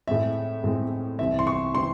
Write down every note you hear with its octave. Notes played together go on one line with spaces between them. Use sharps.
A2 G#3 C4 E5
A2 G#3 C4
C2 C3 E3 C4 E5
C6
C#6
C3 E3 C4 C6